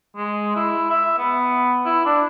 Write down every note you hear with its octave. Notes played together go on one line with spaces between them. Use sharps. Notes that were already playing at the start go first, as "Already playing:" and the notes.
G#3
E4
E5
B3
E4
D4